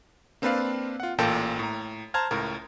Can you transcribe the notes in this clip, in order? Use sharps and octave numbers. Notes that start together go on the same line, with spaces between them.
A#3 C4 D4 B4 D5 F5
F4 F#5
A1 A#2 A#3 A4 G5 A5
A2 A#5
C5 A5 A#5 F6 G#6
C#2 A2 A#4